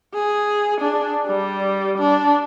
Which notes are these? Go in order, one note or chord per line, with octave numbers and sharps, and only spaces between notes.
G#4
D4
G3
D4